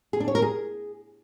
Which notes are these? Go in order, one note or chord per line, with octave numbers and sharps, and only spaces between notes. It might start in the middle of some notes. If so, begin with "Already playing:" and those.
G#4
D4
C#5
A#4
G#4